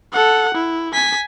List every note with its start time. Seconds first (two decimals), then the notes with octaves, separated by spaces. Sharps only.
0.12 A4 F#5
0.55 E4
0.93 G#5 B6